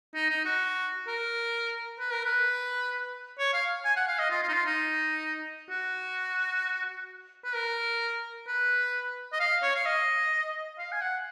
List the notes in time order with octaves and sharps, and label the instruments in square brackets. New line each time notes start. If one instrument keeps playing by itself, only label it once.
[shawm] D#4
D#4
F#4
A#4
B4
A#4
B4
C#5
F5
G#5
F#5
F5
D#5
F4
F4
D#4
F4
D#4
F#4
B4
A#4
B4
D#5
F5
C#5
F5
D#5
F5
G#5
F#5